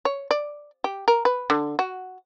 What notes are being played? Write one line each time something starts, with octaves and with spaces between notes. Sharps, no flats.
C#5
D5
G4
A#4
B4
D3
F#4